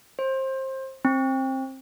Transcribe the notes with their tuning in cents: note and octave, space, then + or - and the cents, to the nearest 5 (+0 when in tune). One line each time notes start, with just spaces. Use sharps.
C5 +25
C4 +20